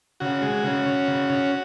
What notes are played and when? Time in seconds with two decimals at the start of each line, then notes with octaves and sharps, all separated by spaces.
0.20 C#3 F#4
0.42 G#3
0.64 C#3
0.86 C#4
1.08 C#3
1.30 C#4